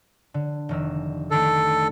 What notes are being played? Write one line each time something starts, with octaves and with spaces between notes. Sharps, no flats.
D3
F1 D#3 E6
D3 D#3 A3 A4